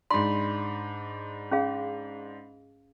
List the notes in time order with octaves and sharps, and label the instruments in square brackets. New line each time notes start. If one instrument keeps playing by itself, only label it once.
[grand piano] G#2 D4 [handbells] B5 [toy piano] C6
[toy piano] C#4 G#4 F5